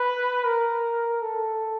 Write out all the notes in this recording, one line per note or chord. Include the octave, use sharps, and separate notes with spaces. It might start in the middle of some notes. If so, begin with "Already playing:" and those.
Already playing: B4
A#4
A4